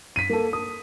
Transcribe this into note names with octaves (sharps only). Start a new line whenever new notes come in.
B6 D#7
A#3 A4
D#6